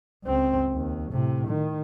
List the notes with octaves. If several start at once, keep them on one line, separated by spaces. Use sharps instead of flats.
C#2 C4
D#2
A2 C3
D#3